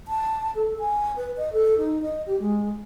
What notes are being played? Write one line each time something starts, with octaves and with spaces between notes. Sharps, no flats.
A5
A4
G#5
B4
D#5
A4
D#4
D#5
G4
G#3